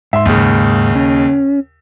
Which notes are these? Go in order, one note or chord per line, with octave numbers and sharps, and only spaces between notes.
G#2 E5 C6
D#2 C#3
C#4